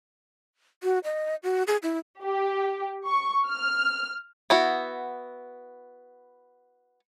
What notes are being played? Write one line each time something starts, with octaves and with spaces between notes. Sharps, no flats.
F#4
D#5
F#4
G#4
E4
G4
C#6
F6
B3 E4 F#4